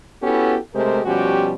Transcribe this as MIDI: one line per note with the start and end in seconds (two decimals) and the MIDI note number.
0.22 0.57 59
0.22 0.57 61
0.22 0.57 64
0.22 0.57 66
0.22 0.57 67
0.22 0.57 69
0.74 1.01 48
0.74 1.01 56
0.74 1.01 57
0.74 1.01 67
0.74 1.01 70
0.74 1.01 72
1.05 1.55 47
1.05 1.55 53
1.05 1.55 55
1.05 1.55 61
1.05 1.55 66
1.05 1.55 67